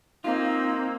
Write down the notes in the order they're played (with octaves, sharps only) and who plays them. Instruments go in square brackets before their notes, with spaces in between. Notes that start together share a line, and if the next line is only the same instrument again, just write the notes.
[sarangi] A#3 [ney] C4 [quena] D#4 [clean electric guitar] F4